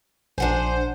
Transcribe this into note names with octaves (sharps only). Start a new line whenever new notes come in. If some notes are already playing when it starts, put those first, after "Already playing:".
A#1 D4 C5 F#5 G#5